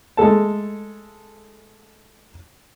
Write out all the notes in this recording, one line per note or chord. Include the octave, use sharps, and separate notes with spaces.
G#3 A3 A4 A5